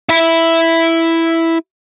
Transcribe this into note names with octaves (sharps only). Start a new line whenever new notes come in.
E4 B5